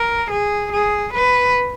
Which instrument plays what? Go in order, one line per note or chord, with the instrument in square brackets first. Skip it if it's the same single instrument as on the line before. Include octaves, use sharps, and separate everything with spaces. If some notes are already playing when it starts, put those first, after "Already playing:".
Already playing: [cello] A#4
G#4
G#4
B4